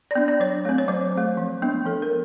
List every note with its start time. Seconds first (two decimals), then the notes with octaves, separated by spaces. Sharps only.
0.11 D5
0.15 B3 D4
0.28 D5
0.40 F#3 C#5
0.65 A3 C4
0.78 C#5
0.88 F#3 C5
1.13 A3 C4
1.37 F3
1.62 G#3 B3 D4
1.86 F3 A4
2.02 A#4